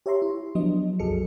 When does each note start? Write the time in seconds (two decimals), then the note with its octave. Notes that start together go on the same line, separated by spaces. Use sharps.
0.06 G4 C#5 E5 A#5 C6
0.22 E4
0.55 F3 F#3 B3 D4 D#5
0.99 C2 F#2 F#3 G#4 A4 C#7